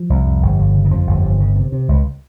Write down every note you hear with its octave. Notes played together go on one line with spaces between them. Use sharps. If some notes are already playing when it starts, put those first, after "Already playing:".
Already playing: F3
C2
F2
G1
G1
C#3
D#3
F2 F3
G1
G1
C#3
C3
C3
C#2